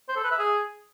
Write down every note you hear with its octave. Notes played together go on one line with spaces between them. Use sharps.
C5
A4
B4
E5
G#4